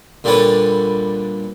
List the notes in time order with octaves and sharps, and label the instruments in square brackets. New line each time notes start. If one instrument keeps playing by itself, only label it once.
[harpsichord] A#2 D3 G3 D4 B4 C#5